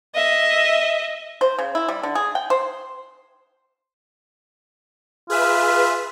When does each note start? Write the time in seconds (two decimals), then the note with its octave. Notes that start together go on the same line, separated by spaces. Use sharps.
0.15 D#5 E5
1.41 C5
1.58 C#3
1.75 E4
1.88 G3
2.03 D3
2.15 G#4
2.35 G5
2.50 C5
5.30 F4 G#4 B4 E5